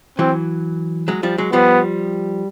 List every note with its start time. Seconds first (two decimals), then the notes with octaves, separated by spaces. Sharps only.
0.19 E3 F#3 C4
1.08 F#3 G#3
1.23 F3 G3
1.38 F#3 G#3
1.53 F3 G3 B3